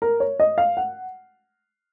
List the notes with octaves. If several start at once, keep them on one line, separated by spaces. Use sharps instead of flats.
A#4
C#5
D#5
F5
F#5